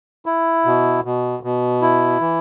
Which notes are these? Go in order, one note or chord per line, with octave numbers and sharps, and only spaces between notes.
E4
B2
B2
B2
E4
E3